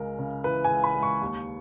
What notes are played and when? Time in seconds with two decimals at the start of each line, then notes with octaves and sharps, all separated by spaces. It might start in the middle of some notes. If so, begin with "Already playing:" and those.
Already playing: C#2 G#3 A#4
0.19 C#3
0.44 E3 B4
0.64 G#5
0.70 C#2
0.84 B5
0.95 G#3
1.03 C#6
1.21 D#2